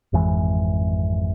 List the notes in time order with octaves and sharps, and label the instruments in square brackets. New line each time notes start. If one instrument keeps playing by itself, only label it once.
[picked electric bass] G#1 F2 E3 G#3